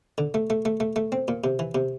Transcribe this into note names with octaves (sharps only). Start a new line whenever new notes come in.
D3
A3
A3
A3
A3
A3
C4
A#2
C3
E3
C3